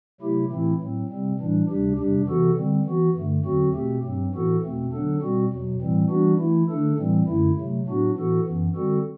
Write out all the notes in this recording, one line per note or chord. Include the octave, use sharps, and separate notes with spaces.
C3 F#3 A3 E4 G4
A2 E3 A3 C4 E4
A2 F#3 C4
C3 G3 C4
A2 E3 G3 D4
D2 C3 G3 D4 G4
E2 C3 G3 D4 G4
C3 E3 B3 F#4 A4
D3 G3 C4
E3 B3 F#4
G2 D3 A3
E2 D3 F#3 C4 F#4
B2 A3 C4 G4
G2 F#3 C4
A2 E3 B3 F#4 A4
E2 B2 A3 C4
D3 F#3 B3 D4 A4
B2 G3 C4 F#4
E2 B2 F#3
A2 E3 G3 C4
E3 G3 B3 D4 F#4
E3 A3 E4
D3 A3 D4 A4
A2 E3 G3 C4
F#2 D3 A3 E4
C3 F#3 A3
A2 F#3 B3 D4 F#4
A2 E3 B3 F#4 A4
F#2 E3 B3
D3 G3 C4 F#4 A4